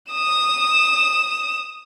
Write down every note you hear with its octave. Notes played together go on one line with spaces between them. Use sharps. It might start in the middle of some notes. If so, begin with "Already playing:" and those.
D#6 E7